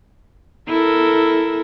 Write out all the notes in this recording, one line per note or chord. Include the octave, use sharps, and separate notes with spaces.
E4 A4 A#4